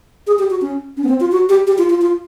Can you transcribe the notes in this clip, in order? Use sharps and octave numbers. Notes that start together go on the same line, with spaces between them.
G#4
G4
F#4
C#4
C#4
B3
C4
F4
F#4
G4
G4
F4
F4
F4